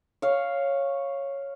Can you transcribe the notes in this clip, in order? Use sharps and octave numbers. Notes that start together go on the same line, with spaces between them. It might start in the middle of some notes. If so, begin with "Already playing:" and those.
C#5 F5